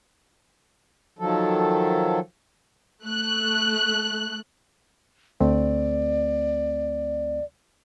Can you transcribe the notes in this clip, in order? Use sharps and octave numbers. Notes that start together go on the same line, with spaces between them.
D#3 F3 F#3 A4
A3 F#6
D2 A3 C4 D5